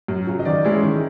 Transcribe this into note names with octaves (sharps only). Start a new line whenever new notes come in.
F#2
C#3 F#3
D#5
D#3 D5
G#3 C#4 E4
D#3